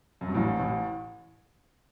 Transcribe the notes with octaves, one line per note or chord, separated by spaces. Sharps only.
F#2
G2
A1 A2
A1 A2